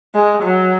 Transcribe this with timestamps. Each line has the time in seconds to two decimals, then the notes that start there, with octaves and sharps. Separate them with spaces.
0.15 G#3
0.43 F#3